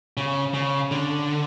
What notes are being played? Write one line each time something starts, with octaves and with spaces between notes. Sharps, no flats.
C#3
C#3
D3